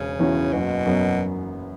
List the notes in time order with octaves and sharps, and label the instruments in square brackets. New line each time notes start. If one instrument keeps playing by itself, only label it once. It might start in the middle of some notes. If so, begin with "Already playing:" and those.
Already playing: [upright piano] E1 [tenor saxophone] C#3
[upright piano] E2 E3 C#4 F#4
[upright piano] F#1 [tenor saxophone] B2
[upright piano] F#2 F#3 B3